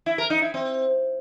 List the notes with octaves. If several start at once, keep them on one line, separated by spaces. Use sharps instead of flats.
E4
A#4
D#4
E4
C4